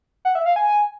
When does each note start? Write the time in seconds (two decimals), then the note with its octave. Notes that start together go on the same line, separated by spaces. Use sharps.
0.25 F#5
0.35 E5
0.46 F5
0.56 G#5